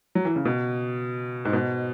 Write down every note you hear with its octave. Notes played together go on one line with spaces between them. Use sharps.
F#3
E3
C#3
B2
G#2
B2